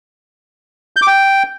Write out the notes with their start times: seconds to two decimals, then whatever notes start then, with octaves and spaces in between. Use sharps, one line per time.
0.96 G6
1.02 D6
1.07 G5